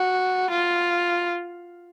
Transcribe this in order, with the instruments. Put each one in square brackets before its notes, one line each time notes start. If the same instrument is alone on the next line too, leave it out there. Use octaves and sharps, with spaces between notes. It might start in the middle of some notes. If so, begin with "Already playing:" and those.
Already playing: [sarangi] F#4
F4